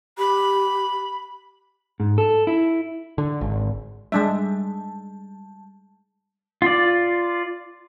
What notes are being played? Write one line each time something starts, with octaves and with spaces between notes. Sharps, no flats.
G4 B5
G#2
A4
E4
D3
G#1
G3 G#3 D4 E5 A5
F4 D5